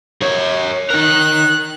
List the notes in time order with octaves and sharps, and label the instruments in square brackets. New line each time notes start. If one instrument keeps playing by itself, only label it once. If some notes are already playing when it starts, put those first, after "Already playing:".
[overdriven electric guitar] A#4 C#5
[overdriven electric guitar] D#4 A#4 [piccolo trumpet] F#6